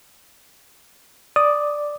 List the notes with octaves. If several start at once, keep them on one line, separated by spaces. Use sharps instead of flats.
D5 D#6